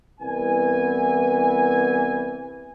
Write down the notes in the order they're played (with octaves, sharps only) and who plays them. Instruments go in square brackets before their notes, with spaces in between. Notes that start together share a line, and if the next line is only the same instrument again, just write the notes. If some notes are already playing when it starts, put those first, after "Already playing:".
[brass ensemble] C2 E3 B3 G#5